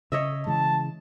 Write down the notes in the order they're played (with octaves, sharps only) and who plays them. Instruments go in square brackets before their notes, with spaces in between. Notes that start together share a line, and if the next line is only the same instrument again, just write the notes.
[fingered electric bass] C#3 [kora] C#5 D#5 E5
[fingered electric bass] C#3 E3 G#3 [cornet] A5